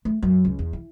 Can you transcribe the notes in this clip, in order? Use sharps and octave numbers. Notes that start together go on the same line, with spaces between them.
A3
F#2
C#2
E2
E3